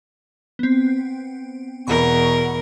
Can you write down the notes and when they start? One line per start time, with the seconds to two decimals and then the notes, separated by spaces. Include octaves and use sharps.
0.59 B3 C4
1.87 E2 B2 A#4 F#5 B5 C#6